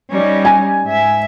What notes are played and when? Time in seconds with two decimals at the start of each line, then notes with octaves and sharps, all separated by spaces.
0.12 G3 C#4 D#4
0.45 G#5
0.85 G#2 E5